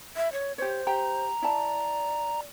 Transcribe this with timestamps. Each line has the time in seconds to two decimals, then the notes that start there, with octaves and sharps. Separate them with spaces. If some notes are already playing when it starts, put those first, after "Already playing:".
0.16 E5
0.33 C#5
0.58 G4 C5 C#5
0.87 G4 G5 A#5
1.42 E4 D5 A5